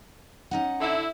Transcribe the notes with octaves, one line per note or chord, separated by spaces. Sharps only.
C#4 D#4 F#5
D3 E4